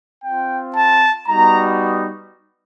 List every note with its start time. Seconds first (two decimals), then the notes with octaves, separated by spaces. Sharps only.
0.23 C4 F4 G5
0.75 A5
1.27 G3 B3 D#4 F#4 A#5